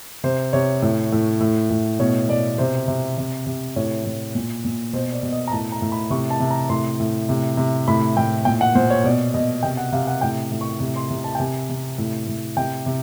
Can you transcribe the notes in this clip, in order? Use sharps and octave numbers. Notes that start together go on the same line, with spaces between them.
C3 C5
C3 C#5
A2
A2
A2
A2
B2 C#5
B2 D5
C3 C5
C3
C3
C3
A2 C#5
A2
A#2
A#2
B2 C5
D5
B2
D#5
A#5
A2 A5
A#5
A2
B5
C3 C#6
A5
C3
A#5
A2 C6
A2
C3
C3
A2 B5
A2 G5
A#2 G5
F#5
A#2 C5
C#5
B2 D5
B2 D#5
C3 G5
F#5
C3 F5
F#5
A2 G5
A2
C#6
C3
C6
C3
A5
G5
C3 G#5
C3
A2
A2
C3 G5
C3